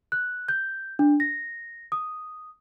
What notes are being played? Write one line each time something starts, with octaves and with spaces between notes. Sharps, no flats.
F#6
G6
D4
A#6
D#6